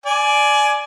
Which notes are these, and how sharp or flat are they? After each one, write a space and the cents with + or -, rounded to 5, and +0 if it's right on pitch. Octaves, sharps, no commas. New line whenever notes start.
D5 +0 G#5 +20